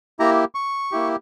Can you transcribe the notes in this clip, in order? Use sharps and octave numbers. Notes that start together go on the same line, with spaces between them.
A#3 E4 G4 A#5
C#6
A#3 E4 G4